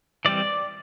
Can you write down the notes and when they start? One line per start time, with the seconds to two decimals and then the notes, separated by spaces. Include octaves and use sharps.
0.25 E3 G3 C4 D5